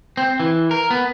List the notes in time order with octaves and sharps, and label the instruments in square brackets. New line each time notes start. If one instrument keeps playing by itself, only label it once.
[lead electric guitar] C4
E3
A#4
B3